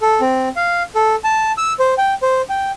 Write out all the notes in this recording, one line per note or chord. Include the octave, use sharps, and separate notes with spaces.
A4
C4
F5
A4
A5
E6
C5
G5
C5
G5